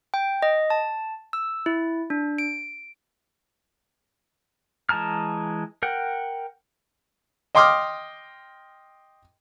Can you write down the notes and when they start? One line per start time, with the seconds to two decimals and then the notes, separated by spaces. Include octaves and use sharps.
0.14 G5
0.43 D#5
0.70 A5
1.33 E6
1.66 E4
2.10 D4
2.38 D7
4.89 E3 G#3 A5 A#5 F6
5.83 A#4 F#5 G5
7.55 D#5 G5 C6 D6 D#6 F6